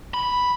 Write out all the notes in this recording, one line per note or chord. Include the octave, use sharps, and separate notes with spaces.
B5